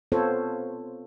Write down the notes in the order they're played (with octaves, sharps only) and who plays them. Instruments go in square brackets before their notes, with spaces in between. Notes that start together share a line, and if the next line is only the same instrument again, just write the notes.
[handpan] B3 C4 F4 A4 C5 C#5